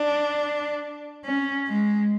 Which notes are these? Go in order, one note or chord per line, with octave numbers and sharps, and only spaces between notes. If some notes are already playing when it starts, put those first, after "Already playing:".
Already playing: D4
C#4
G#3